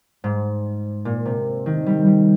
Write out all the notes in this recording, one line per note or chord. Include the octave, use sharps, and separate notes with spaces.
G#2
A#2
C3
D#3
G3
G3